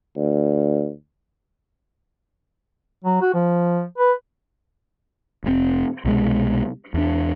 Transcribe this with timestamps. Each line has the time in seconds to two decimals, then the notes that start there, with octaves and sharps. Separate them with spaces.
0.16 D2
3.04 F#3
3.21 F#4
3.34 F3
3.98 B4
5.44 F1 A2 C4
6.05 C2 B2 G#3
6.94 E2 D4